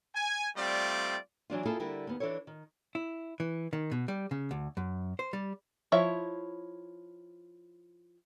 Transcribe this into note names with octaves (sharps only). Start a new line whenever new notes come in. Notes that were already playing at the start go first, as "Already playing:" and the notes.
G#5
G3 A3 C4 F4 D5
E3 F#3 D4 F4
A#3 E4 F4 G#4 A4
D3 G3 E4 A#4
D#2 B3
E3 D4 E4 A4 C#5
D#3
E4
E3
D#3
B2
G3
C#3
D2
F#2
C5
G3
F3 E4 C#5 E5